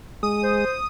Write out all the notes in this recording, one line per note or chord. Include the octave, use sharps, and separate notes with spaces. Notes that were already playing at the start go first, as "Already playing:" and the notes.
G#3 D#6
C5